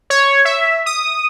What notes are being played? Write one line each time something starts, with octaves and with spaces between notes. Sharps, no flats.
C#5
E5
D#6